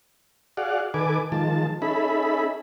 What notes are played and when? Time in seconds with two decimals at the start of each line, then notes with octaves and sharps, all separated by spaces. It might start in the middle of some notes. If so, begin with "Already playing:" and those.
0.57 F#4 G#4 D5 F5 F#5
0.94 D#3 A4 B4 G#5 D6
1.32 D#3 F3 G#3 A5
1.82 C#4 D#4 G#4 A4 E5 B5